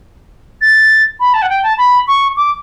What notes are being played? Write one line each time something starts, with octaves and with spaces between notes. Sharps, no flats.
A6
B5
A5
F#5
G5
A5
B5
C#6
D6